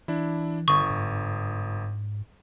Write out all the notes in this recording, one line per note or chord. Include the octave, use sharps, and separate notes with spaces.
E3 D4 E4
G1 D3 C#6 D#6
G#2